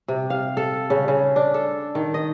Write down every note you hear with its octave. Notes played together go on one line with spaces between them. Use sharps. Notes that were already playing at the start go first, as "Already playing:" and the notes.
C3
F5
A4
C#3
C#3
D4
A4
D#3
D#5